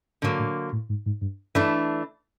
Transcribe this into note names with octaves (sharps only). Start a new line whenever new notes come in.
G#2 D3 F#3 A#3
A2
A2
G#2
G#2
G2
G2 E3 A3 D4